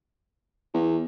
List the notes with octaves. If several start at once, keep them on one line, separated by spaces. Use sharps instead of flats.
E2